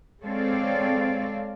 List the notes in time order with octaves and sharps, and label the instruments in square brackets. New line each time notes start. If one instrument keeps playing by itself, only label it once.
[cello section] G#3 C4 A4 C#5 D5 F5